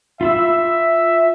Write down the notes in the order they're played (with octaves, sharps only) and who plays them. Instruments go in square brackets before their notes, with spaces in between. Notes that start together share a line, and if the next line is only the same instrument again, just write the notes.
[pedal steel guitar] F4 B5 E6 [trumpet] E5